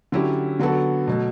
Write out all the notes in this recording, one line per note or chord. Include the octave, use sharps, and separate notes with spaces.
D3 F#3 C#4 E4 G4
D3 F#3 B3 F#4 A4
B2 F#3 A3